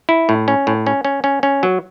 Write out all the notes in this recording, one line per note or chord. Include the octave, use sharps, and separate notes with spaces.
E4
A2
C#4
A2
C#4
C#4
C#4
C#4
F#3